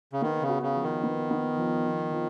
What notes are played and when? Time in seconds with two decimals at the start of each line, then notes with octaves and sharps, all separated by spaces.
0.13 C#3
0.22 D#3 B3
0.42 C#3
0.49 F#4
0.63 C#3
0.76 F3
0.83 D#3
1.03 B3
1.31 B3
1.57 F3
1.85 F3
2.12 F3